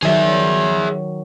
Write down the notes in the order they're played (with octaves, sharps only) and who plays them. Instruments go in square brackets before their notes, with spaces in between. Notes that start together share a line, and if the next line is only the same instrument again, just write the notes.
[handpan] D#3 F#3 [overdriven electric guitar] G#4 E5